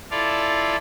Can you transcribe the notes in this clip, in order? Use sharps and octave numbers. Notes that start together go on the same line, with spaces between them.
E4 F4 A4 D5 F5